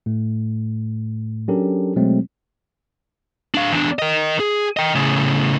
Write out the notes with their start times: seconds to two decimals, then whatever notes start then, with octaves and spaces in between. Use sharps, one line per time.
0.06 A2 A3
1.48 F#3 C#4 D4 G4 A4 A#4
1.96 B2 F#3 G#3 A3 C4
3.54 D4 F5
3.71 E2 D4
3.99 A#4 D#5
4.40 G#4
4.77 D#5 G5
4.95 A2 C#3